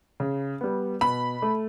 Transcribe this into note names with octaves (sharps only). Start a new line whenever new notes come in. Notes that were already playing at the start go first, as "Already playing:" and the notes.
C#3
G3 B3
B2 B5
A3